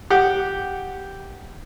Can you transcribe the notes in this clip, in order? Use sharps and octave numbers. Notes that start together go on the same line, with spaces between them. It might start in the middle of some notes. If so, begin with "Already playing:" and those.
G4 F#5